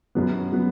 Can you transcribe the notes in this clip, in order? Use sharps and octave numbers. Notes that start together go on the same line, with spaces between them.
F#2 F#3 B3
F#3 B3